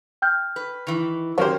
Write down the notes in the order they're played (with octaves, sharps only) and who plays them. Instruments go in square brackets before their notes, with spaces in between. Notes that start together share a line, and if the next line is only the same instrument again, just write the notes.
[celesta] G5 F6 G6
[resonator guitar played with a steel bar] B4
D#3 E3
[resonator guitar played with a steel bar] D#3 A#3 [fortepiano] F#3 C#4 C5 [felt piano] G4 A#4 C#5